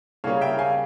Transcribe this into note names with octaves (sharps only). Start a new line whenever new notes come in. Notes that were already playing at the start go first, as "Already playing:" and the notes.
C#3 G3 A#3 C#4 C#5 F5
E5 G5
F5 G#5